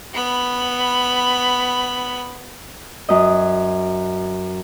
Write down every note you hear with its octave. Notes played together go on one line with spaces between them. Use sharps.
B3 B5
F#2 D#5